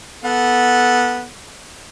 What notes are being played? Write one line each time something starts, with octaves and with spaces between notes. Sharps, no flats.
B3 A4 F#5